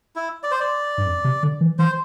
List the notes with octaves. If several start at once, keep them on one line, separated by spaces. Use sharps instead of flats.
E4
D5
C5
D5
G2
F2
C3
D3
E3
E3 C5